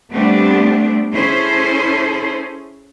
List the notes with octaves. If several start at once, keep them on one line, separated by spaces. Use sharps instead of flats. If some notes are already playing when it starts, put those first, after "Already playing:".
G3 A3 B3 C4 D4 G4
C#4 E4 G#4 A4 C5